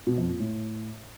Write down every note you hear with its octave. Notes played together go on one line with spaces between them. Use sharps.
B2
F2
A#2
A2